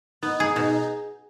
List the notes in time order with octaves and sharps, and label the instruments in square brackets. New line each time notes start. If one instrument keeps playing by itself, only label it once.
[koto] B3 [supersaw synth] D#4
[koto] G#4
[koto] B2 [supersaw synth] D#4